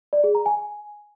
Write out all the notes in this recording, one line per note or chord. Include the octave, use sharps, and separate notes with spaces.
D5
G#4
A#5
G#5